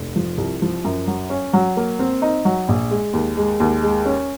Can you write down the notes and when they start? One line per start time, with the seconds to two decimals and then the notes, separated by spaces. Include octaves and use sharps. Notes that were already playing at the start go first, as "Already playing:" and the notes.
Already playing: F1
0.16 F3
0.38 C2
0.62 F3
0.84 F#2
1.07 F#3
1.30 C#4
1.53 F#3
1.77 A#3
1.99 C4
2.22 D#4
2.45 F#3
2.69 A#1
2.91 G#3
3.13 D#2
3.37 G#3
3.60 D#2
3.83 G#3
4.05 C#4